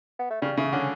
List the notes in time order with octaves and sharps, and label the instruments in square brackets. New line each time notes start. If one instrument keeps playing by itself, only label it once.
[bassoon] B3
A3
[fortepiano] C#3 [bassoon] G3
[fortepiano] C#3 [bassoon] A3
[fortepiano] D3 [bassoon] C#4